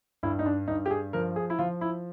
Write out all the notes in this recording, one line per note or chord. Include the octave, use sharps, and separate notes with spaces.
G2 E4
D#4
D4
G2 D#4
G4
G#4
F3 A#4
G#4
E4
F3 F4
E4